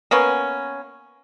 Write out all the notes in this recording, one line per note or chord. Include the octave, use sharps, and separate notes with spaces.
A#3 B3 C#4